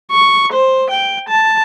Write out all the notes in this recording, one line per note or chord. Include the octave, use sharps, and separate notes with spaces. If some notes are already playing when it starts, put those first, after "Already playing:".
C#6
C5
G5
A5